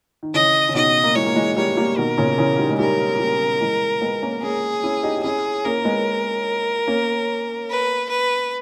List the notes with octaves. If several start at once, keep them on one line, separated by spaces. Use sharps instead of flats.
D#3
C#3 E3 D#5
C#3
B2 D#3 D#5
A#3
E3 G#3 C#5
A#3
E3 G#3
G3 A#3 C#5
G3 A#3
B2 D#3 A#4
A#2 C#3
C#3 E3
D#3 G3
G#3
D#3 G3 A#4
G3 A#3
E3 G#3
G#3 B3
A#3 C#4
A#3 C#4 G#4
C#4 E4
D#4 G4
G4
C#4 E4 G#4
A#3 C#4 A#4
G#3 B3
A#3 C#4
B4
B4